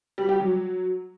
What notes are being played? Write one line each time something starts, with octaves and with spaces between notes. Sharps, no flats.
G3
G4
F#3